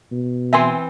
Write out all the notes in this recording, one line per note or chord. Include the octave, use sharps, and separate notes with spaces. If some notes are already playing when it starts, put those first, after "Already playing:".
B2
E3 C4 E5 G#5 C6